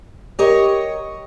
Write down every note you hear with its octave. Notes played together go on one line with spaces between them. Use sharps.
G4 A#4 C#5 D#5